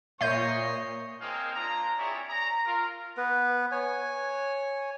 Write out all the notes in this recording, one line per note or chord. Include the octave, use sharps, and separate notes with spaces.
A#2 C#5 D#5 E5 G6 C7
G#3 A#3 C4 D#4 G#4 F5
A#3 D4 F4 A#5
C4 E4 G#4 C#5 D5 E5
A#5
F4 A#4
B3 B4
C#5 G#5